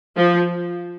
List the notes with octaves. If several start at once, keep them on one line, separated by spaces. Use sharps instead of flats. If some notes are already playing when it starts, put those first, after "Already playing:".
F3